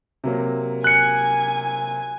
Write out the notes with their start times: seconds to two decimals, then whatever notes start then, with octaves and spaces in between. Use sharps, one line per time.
0.24 C3 F#3 A#3
0.84 G#5 F#6 C#7